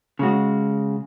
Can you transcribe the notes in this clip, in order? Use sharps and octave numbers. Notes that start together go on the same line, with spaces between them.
C#3 G#3 F#4